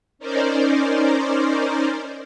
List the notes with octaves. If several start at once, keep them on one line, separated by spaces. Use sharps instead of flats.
C#4 D#4 A#4 C5 D5